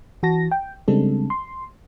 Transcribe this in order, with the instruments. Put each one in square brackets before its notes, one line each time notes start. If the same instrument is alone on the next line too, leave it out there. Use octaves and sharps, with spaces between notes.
[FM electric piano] E3 F#4 A5 A#6
G5
C#3 G3 G#3 C4 D4 A4
C6